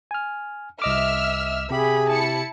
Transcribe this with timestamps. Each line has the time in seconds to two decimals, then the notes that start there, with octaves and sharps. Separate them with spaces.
0.11 G#5 F6
0.82 C2 D#5 E5 D6 E6 F6
1.70 C3 G4 G#4 E5 B5
2.08 E4 A5 C#7